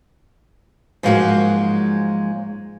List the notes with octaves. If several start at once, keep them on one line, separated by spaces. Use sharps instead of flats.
G#2 F3 F#3 G#3 A#3 F#4